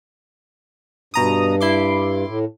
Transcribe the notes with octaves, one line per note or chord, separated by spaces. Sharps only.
G2 B2 A#5 D#6
E4 C6 D6
A2